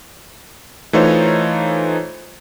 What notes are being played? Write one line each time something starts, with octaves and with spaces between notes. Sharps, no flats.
E3 A3 D#4 F4 C5 C#5